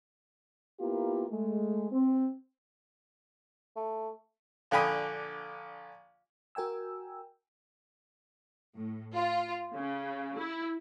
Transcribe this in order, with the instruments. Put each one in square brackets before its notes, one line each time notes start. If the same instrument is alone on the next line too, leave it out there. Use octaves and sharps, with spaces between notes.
[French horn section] A#3 B3 E4 F4 G4 A#4
G#3 A3
C4
[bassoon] A3
[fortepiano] A#1 D3 G5 G#5 B5 D#6
[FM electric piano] F#4 A#4 G5 G#5 E6
[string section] A2
F4
C#3
E4